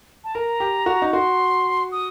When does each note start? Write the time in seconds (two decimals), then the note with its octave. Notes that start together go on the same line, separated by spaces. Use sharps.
0.24 A5
0.35 A#4 A#5
0.60 G4
0.86 F#4
1.02 D#4
1.13 F#4 C6
1.92 D#6